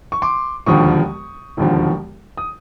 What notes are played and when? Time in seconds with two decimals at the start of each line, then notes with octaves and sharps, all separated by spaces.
0.12 C#6
0.22 C6 D6
0.66 E1 D#2 D3 F3 C#6 D#6
1.57 E1 D#2 D3 F3
2.37 D#6